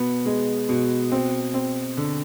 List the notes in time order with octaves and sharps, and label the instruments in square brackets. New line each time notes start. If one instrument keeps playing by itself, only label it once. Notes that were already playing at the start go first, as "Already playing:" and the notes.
Already playing: [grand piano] B2 B3
G#3
B2
C4
C4
D3